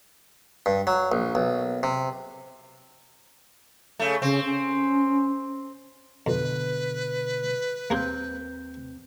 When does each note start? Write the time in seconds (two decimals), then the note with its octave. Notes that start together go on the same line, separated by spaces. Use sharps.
0.66 G2
0.87 F#3
1.12 A#1
1.35 B1
1.83 C3
4.00 C#3 A3
4.22 C#3 C4
4.45 C#4
6.27 F2 B2 D3 B4
7.90 D#2 A#3 C4 G#4 C5 G6